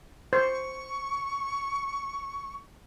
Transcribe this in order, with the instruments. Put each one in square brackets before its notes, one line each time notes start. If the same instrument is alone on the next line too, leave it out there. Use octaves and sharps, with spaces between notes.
[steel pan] C5 [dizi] C#6